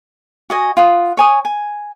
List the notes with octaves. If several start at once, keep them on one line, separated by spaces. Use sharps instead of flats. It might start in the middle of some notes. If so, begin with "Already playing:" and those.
F#4 D#5 G#5
F4 F#5 D#6
C#5 G#5 D#6
G#5